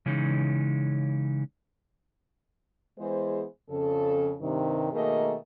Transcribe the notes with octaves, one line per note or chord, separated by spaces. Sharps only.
C#3 E3 G#3 C#4 D#4
E3 G#3 B3 G#4 C5
F2 C#3 A4
G2 C3 D#3
B2 D#3 A3 A#3 G#4 D#5